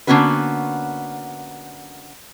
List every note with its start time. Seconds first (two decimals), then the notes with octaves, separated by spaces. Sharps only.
0.07 D3 A#3 B3 C#4 F#4 B4